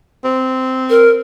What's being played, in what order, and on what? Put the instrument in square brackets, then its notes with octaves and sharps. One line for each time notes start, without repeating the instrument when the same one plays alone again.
[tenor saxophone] C4
[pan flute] A#4